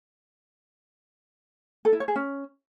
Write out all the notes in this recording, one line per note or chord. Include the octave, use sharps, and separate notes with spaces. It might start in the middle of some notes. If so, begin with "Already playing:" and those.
A4
E4
C#5
G#4
C#4